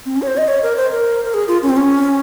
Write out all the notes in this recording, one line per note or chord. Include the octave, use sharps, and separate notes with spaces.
C4
C#4
C#5
C5
D#5
C#5
A#4
C5
A#4
A#4
G#4
F4
C#4
C4
C#4